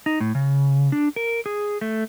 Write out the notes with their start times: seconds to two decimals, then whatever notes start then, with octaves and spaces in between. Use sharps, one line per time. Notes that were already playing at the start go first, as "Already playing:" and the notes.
0.06 D#4
0.20 A2
0.35 C#3
0.92 D4
1.16 A#4
1.46 G#4
1.81 A3